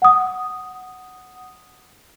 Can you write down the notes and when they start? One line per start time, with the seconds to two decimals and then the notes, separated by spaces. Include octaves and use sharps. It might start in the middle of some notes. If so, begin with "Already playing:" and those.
0.02 F#5 D#6